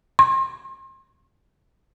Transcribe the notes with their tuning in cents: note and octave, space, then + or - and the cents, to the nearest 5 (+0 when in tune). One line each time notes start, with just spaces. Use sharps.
C6 +30